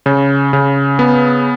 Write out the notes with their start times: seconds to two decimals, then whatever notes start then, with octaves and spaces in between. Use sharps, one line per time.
0.06 C#3
0.53 C#3
0.99 B3